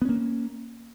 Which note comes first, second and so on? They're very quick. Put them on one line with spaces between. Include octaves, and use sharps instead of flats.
B3 C#4 A#3